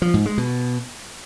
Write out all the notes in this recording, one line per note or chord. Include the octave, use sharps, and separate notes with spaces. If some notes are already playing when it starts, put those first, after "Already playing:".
F3
G#2
G#3
B2